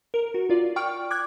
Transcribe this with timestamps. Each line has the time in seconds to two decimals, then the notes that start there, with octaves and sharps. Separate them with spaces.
0.14 A#4
0.34 F#4
0.50 F4 D5
0.76 D5 G5 C#6 F6 D7
1.11 D6 F#6 G#6